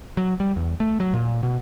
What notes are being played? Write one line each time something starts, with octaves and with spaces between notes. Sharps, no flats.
F#3
G3
E2
A3
F#3
A#2
B2